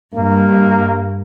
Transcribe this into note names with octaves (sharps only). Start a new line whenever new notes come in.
G2 A#3